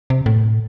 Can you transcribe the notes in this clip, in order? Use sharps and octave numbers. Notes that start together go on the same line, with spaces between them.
C3
A2